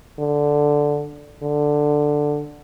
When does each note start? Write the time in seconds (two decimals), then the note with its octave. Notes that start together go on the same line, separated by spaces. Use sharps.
0.19 D3
1.42 D3